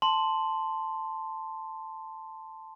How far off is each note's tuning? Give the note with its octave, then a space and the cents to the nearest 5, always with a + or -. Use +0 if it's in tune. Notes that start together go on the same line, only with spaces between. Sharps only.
A5 +0 C6 +0